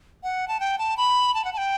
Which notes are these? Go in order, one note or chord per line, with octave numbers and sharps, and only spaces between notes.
F#5
A5
G5
A5
B5
A5
F#5
A5
G5